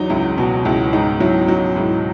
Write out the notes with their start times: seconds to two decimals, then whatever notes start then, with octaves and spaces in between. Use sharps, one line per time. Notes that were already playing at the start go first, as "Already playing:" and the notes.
Already playing: E2 F#3 D#4
0.10 C#2 E4
0.37 B2 F#4
0.65 C#2 E4
0.93 G#2 D#4
1.20 F#3 E4
1.48 F#3 D#4
1.76 G#2 E4